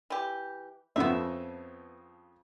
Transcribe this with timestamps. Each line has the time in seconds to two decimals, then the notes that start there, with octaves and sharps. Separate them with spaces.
0.10 E3 G4
0.96 F2 C#3 F3 B3 E5